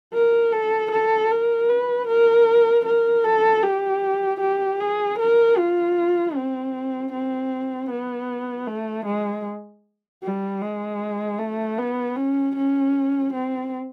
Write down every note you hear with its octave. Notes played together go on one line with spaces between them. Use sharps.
A#4
A4
A4
A#4
B4
A#4
A#4
A4
G4
G4
G#4
A#4
F4
C4
C4
B3
A3
G#3
G3
G#3
A3
B3
C#4
C#4
C4